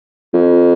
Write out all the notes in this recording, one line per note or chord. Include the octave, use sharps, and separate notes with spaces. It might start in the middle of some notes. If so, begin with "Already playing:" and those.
F2